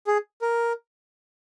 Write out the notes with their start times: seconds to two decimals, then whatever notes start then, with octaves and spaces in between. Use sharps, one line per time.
0.07 G#4
0.42 A#4